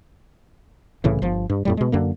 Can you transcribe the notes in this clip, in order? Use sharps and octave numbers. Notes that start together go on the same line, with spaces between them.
C2 A2 C#3 E3
G1 F3
G2
F2 A2 G3
B2 G#3
F#2 D3 A#3